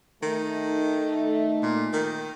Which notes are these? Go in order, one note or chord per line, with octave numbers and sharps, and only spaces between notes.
D#3 A3 D#4
A#2
D#3